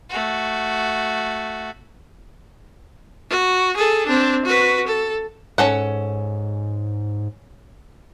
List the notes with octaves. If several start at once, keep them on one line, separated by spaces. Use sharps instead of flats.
A3 F#4
F#4
G#4 A4
C4 D4
F#4 B4
A4
G#2 C#4 A4 F#5